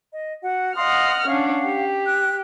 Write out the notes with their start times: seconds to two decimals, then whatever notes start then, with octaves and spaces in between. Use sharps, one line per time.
0.13 D#5
0.43 F#4 F#5
0.76 D#5 F5 F#5 C6 D#6 F6
1.27 C#4 D4 F5 F#5
1.64 G4
2.05 F#6